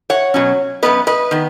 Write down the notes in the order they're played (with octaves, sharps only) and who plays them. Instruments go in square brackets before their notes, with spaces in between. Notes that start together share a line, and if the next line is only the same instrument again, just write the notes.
[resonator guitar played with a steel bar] C#5 F#5
B2 F#3 C#4
F#2 D#3 B3 B4 D#5
B4 D#5
D#3 B3